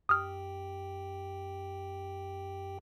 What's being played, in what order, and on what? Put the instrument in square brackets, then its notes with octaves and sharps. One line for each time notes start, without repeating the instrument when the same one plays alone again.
[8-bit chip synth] F#2 G4 G5 [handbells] D#6 F6